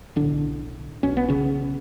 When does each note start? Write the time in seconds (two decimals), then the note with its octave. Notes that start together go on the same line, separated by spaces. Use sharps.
0.16 B1 A2 D3 D4
1.03 B1 B2 C#4
1.17 B3
1.29 C#3 C#4